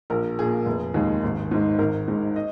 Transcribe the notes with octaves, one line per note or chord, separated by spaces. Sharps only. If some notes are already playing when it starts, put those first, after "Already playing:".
A#1 A#4
A#2 A#3 G#4
F1
D#2 D#3 G#3
G#1
G#2 G#3
G#1 A#4
G#2 D#3 G#3
D#5